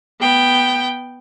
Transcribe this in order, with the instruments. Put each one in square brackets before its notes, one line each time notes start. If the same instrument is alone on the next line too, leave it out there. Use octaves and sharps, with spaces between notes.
[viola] B3 G5